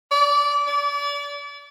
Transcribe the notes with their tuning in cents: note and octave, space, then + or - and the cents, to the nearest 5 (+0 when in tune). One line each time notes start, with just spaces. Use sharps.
D5 -20
D5 -35